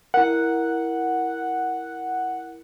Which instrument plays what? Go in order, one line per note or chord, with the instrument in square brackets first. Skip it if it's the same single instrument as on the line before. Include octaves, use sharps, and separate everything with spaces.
[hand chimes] E4 A#4 [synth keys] F#5